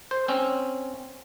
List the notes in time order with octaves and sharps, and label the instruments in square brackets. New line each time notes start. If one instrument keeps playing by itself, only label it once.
[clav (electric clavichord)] C5
C4 C#4